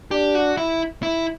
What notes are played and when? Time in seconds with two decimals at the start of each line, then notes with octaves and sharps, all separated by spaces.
0.11 D4 G4
0.35 F#4
0.57 E4
1.03 E4